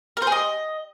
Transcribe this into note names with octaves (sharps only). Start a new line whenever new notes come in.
A#4
C5
G#4
D#5